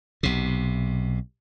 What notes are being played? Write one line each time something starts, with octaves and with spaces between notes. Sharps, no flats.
B1 C3